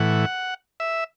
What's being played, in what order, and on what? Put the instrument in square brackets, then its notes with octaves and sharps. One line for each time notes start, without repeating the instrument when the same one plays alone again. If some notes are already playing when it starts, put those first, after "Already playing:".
Already playing: [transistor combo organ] A2 E3 F#5
E5